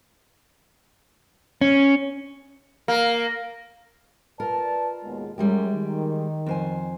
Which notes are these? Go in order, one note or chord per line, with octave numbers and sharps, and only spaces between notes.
C#4
A#3
F4 A#4 B4 D5 A5
D#2 B2 G#3
F#2 G3 G#3 G4
D#3
F2 C5 G#5